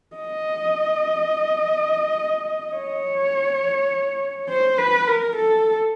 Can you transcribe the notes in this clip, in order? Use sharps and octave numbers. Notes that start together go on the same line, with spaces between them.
D#5
C#5
C5
B4
A#4
A4